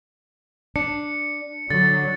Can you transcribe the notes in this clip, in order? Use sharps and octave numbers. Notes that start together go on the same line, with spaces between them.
D4 C#7
D3 F#3 A6